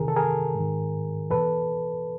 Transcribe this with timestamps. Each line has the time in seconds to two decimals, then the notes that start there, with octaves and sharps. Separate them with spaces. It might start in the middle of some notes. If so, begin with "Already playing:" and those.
Already playing: E2 C3 D#3 G#4 A#4
0.08 A4
0.16 G#4 A#4
0.55 G#2 D#3
1.31 E2 B2 A4 B4